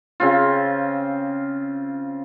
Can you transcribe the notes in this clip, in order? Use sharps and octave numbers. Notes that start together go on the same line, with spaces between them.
C#3 C4 F4